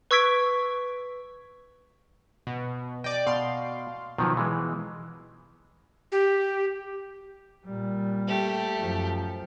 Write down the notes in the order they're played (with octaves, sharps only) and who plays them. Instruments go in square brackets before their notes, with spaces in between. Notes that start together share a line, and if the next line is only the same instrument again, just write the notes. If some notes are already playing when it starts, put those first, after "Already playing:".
[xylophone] B4 C#6 E6 G#6 B6 D7
[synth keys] B2
[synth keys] D5 G5 [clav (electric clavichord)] D#5
[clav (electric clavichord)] B2 [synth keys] F5 C6
[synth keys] B2 [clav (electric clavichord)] D#3 F3 F#3
[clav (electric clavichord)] E3 G#3
[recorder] G4
[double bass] A#2 G3
[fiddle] A3 G4
[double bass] F#2 F3